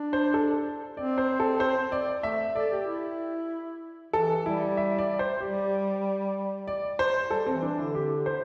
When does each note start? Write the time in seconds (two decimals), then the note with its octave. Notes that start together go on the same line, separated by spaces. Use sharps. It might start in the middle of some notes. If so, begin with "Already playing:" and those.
Already playing: D4
0.13 C5
0.34 A4
0.97 C4 D5
1.18 C5
1.40 A4
1.60 C5
1.92 D5
2.23 A3 E5
2.55 A4 D5
2.72 G4
2.87 E4
4.13 E3 A4
4.46 G3 E4
4.77 E5
4.98 D5
5.19 C5
5.41 G3 G4
6.67 D5
6.99 C5
7.31 G3 A4
7.46 C4
7.52 E3
7.63 D4
7.73 D3
7.78 E4
7.95 G4
8.26 C5